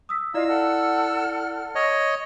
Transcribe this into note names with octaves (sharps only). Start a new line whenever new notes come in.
D#6 E6 B6
E4 F4 D5 D#5 F5 E6
A4 F#5 F6
C#5 D#5